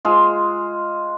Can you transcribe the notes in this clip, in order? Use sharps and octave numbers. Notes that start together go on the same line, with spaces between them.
G#3 F4